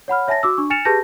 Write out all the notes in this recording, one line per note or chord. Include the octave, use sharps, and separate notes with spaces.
C#5 F#5 B5 F6
C#5 E5 G#5 A5 A6 A#6
F#4 D6 E6
D4 C#6
G#5 F6 A6 C#7 E7 F7
G4 G#4 B4 A5 G6 A#6